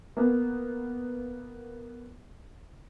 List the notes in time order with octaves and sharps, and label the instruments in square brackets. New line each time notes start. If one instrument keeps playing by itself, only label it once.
[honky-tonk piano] A#3 B3